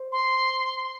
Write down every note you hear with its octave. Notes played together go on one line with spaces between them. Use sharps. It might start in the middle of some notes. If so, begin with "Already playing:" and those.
Already playing: C5
C6